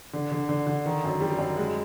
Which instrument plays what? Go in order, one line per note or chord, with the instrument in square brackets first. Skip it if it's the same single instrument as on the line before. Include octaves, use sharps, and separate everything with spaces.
[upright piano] D3
D3
D3
D3
D#3
F#2
G3
F#2
G#3